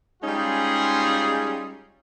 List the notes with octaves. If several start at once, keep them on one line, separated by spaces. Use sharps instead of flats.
G3 G#3 C#4 D#4 F4 G#4